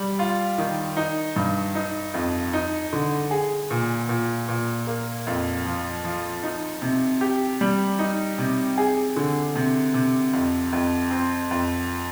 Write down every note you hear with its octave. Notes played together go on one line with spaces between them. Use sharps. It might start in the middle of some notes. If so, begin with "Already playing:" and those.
Already playing: G3
F4
D#3
D#4
G2
D#4
F2
D#4
D3
G#4
A#2
A#2
A#2
A#3
F2
F3
F3
D#4
C3
G4
G3
D#4
C3
G#4
D3
C3
C3
F2
F2
C4
F2